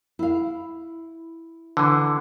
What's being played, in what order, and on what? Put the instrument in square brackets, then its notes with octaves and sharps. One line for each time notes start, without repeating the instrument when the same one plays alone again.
[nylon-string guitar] E4 F5
[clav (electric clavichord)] D3 E3